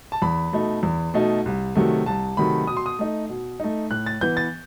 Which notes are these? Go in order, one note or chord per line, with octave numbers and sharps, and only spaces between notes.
A5
E2 B5
B2 A3 D#4
E2
B2 A3 D#4
C2
C3 D#3 F#3 A3
C2 A5
C3 D#3 F#3 A3 B5
B2 D#6
C6
D#6
A3 D#4
B2
A3 D#4
A2 F#6
A6
E3 B3 G6
A6